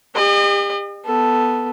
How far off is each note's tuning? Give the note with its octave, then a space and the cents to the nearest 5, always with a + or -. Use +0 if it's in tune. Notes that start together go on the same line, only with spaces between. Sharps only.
G4 +40 D#5 -40
B3 +0 A4 +0